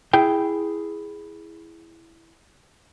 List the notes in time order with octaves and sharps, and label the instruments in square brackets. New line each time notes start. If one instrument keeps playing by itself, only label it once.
[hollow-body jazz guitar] E4 G#4 G5